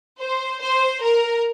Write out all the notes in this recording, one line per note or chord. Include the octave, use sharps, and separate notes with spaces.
C5
C5
A#4